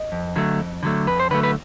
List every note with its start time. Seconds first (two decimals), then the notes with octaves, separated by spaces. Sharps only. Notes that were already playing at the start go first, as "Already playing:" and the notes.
Already playing: D#5
0.12 F2
0.36 D3 F#3 A3
0.59 F2
0.83 D3 F#3 A3
1.07 F2 B4
1.20 C5
1.31 D3 F#3 A3 B4
1.43 B4